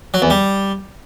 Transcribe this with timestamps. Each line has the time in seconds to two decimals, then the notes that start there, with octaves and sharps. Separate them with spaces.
0.14 F#3
0.22 E2
0.30 G3